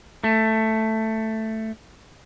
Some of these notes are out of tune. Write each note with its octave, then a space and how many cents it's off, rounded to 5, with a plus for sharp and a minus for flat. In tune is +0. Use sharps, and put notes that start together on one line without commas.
A3 +5